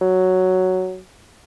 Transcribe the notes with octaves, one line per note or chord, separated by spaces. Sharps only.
F#3